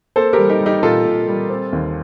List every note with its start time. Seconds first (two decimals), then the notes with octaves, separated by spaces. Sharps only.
0.16 A#3 A4 C5
0.33 G4 A#4
0.39 G3
0.49 D#4 G4
0.61 G3
0.66 D#4 G4
0.83 A#2 F4 A4
1.06 A#2
1.28 G3
1.50 C4
1.73 D#2